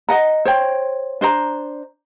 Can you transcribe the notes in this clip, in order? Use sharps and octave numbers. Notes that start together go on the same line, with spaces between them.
D#5 F#5 A#5
C5 C#5 G5
D4 C5 C#5 A#5